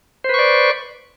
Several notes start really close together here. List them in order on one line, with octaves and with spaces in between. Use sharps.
C5 B4 C#6 D5